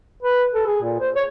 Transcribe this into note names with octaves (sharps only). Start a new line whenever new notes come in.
B4
A4
G#4
A#2
C5
C#5